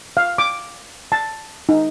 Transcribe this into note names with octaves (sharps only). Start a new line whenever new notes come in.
F5
D6
A5
D#4